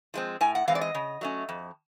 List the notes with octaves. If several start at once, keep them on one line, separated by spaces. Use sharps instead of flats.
F3 G#3 C4
A2 G#5
F#5
E3 G#3 C4 F5
D5
D#5
C#3
F#3 A3 C#4
F2